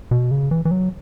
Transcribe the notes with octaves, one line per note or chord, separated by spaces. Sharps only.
B2
C#3
E3
E3
F#3